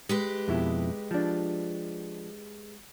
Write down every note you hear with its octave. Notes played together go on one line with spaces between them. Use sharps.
G#3 G4 B4
F2 B2 E4
F3 D4